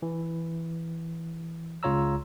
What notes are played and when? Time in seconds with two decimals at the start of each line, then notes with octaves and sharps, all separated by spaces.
0.02 E3
1.83 C#2 C#3 F4 C#5 A#5 E6